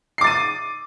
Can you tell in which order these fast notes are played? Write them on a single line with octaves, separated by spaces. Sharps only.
C7 D6 A6 D#7